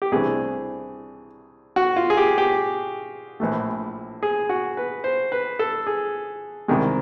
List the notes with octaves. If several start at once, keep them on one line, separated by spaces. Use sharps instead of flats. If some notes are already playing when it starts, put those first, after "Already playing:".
G4
C2 C3 E3 A3 D4 G#4
F#4
F4
G#4
G4
G4
A#1 A2 E3 A3
G#4
F#4
B4
C5
B4
A4
G#4
C2 C3 D#3 G#3